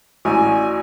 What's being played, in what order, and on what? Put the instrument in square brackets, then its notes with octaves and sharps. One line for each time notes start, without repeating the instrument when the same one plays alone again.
[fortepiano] A1 [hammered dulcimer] F#4 D5 D#5 [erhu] G#5